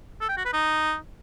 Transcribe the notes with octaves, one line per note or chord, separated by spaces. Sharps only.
A4
G5
F#4
B4
D#4